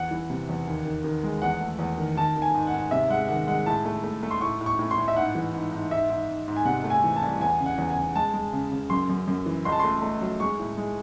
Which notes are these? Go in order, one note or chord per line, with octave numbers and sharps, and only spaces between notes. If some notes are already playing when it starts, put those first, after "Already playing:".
Already playing: E2 F#5
E3
C3
E2
D#2
D#3
D#3
G#3
E2 F#5
A3
E2
D#3
D#3 A5
D#3
G#5
G#2
F#5
G#2
C3 E5
G#3 F#5
D#3 F#5
G#3 F#5
A2 A5
A3
A3
A3
C6
A2 C#6
A2
C#6
A2
C6
A2
E5
G#2 F#5
E3
G#2
G#2
G#2 E5
G#2
G#2
G#2
G#5
C3 F#5
A3
G#5
E3
A5
C2
E2 G#5
C#3
F#5
E2
G#5
C#3
G#3 A5
G#3
C#3
C#3
F#2 C6
F#2
F#2
E3
C#2 C6
A5
A3 C6
A3
F#3
G#3 C#6
A2
G#3